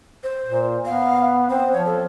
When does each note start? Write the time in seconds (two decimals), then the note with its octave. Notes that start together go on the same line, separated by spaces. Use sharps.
0.23 C5
0.45 A#2
0.85 B3 F5
1.50 C4 C5
1.73 F3 C#5
1.86 A4